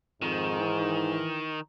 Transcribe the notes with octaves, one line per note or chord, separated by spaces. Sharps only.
F2 G#2 D#3
E3